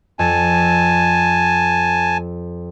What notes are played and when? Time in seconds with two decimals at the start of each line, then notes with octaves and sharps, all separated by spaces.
0.19 F2 G#5 A5